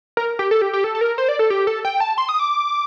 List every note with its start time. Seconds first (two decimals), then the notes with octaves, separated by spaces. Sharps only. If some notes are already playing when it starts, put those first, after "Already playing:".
0.17 A#4
0.39 G4
0.51 A4
0.62 G4
0.73 G4
0.84 A4
0.95 A4
1.01 A#4
1.18 C5
1.29 D5
1.39 A4
1.50 G4
1.67 A4
1.85 G5
2.00 A5
2.18 C6
2.29 D#6
2.39 D6